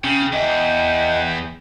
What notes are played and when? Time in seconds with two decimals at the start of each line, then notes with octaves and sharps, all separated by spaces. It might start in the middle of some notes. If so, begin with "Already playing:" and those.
0.04 C#3 C#4 G5
0.33 E2 D#5 E5